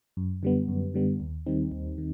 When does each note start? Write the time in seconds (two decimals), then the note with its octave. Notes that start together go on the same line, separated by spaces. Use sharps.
0.17 F#2
0.43 D3 G3 B3
0.68 F#2
0.94 D3 G3 B3
1.20 D#2
1.46 D#3 G3 C4 D#4
1.72 D#2
1.98 D#3